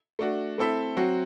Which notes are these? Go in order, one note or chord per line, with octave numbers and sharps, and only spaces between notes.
A3 D4 F#4
A3 C4 E4 A4 E5
F#3 C4 F#4